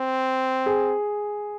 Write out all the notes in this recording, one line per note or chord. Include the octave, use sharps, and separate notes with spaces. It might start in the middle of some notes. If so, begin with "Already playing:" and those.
Already playing: C4
G#4